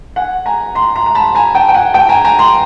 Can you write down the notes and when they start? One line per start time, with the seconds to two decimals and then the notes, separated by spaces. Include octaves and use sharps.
0.16 F#5 G#5
0.46 G#5 A#5
0.75 A#5 C6
0.96 A#5 C6
1.06 A#5
1.15 A5 B5
1.35 G#5 A#5
1.55 G5 A5
1.68 G5
1.75 F#5 G#5
1.94 G5 A5
2.09 G#5 A#5
2.25 G#5 A#5
2.39 A#5 C6